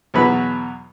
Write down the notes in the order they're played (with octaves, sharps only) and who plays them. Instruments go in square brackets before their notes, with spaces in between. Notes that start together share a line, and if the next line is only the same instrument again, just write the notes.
[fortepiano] E2 B2 F#3 F#4 B4 B5